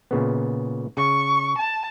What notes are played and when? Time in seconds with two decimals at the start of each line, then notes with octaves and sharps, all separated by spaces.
0.11 A#2 C#3 B3
0.97 C#3 C#6
1.58 A5